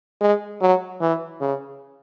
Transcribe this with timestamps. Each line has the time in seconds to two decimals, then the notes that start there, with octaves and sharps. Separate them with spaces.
0.21 G#3
0.61 F#3
1.01 E3
1.41 C#3